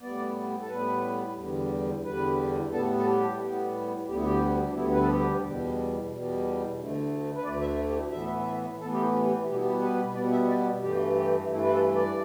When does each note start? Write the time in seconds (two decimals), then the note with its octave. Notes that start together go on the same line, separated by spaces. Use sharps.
0.01 A2 G3 B3 D5
0.60 A4
0.68 A2 G3 B3 B4
1.36 E2 D3 G3
2.03 E2 D3 G3 B4
2.71 A2 G3 B3 A4
2.98 A4
3.05 G4
3.39 A2 G3 B3
4.06 D2 D3 G3 B3 G4
4.15 E4
4.23 G4
4.68 D4
4.73 D2 D3 G3 B3 E4
4.92 B4
4.99 A4
5.07 G4
5.42 E2 B2 G3
6.09 E2 B2 G3
6.76 D2 D3 A3
7.35 B4
7.43 D2 D3 A3 D5
7.61 E5
7.89 G4
7.95 E4
8.11 A2 E3 B3 E5
8.39 E5
8.80 A2 E3 B3 A4
8.92 G4
9.02 E4
9.24 G4
9.46 B2 G3 B3 G4
9.54 E4
9.62 G4
9.81 B4
10.14 B2 G3 B3 D5
10.32 E5
10.48 D5
10.81 G2 E3 A3 G4
11.16 G4
11.50 G2 E3 A3 E4
11.62 B4
11.72 A4
11.95 D5